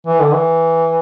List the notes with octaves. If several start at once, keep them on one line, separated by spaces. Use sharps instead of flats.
E3
D3
E3